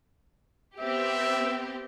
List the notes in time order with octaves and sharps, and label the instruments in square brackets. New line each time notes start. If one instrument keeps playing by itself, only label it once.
[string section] B3 C4 G4 [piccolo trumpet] E5